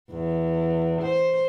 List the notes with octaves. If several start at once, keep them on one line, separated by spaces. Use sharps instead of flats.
E2
C5